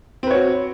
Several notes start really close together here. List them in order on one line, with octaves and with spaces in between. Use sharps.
C4 B4 C#5 F#4